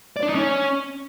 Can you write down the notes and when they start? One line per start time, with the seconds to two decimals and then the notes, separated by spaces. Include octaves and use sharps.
0.16 D5
0.23 D4
0.29 D#4
0.35 C#4